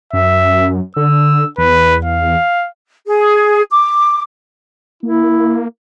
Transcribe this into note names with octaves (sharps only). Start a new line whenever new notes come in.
F#2 E5
D3 E6
E2 B4
F5
G#4
D6
A#3 E4